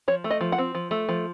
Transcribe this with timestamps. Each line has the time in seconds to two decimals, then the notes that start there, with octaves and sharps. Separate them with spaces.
0.08 F3 C#5
0.24 A3
0.31 D#5
0.41 F3
0.52 F#5
0.58 C4
0.75 F3
0.91 A3
1.09 F3